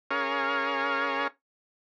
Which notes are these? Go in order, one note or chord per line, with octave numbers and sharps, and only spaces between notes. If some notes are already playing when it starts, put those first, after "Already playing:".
C#4 G#4 A#4 C#5 F5